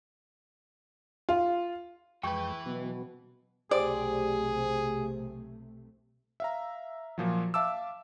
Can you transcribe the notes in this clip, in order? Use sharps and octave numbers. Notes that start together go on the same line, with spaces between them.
F4
F2 E3 G#3 B4 G5 C#6 G6
B2 F#3 B3
B1 C3 A3 G4 G#4 C5 D5
E5 F5 A#5
A#2 F3 F#3
E5 F5 A5 D6 E6